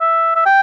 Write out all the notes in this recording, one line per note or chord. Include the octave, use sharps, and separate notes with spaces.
E5
E5
G5